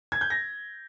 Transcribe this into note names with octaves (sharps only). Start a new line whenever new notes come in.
G#6
G6
A#6